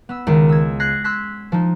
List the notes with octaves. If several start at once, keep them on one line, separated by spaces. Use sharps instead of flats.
B3 E6
C#2 D#3
E6 G#6
F#6 G#6 A#6 C7
C6 E6 F#6 G#6 B6
F3 D#4